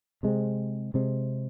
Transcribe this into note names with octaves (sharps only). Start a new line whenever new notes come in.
C3 G#3 C4
C3 G#3 C4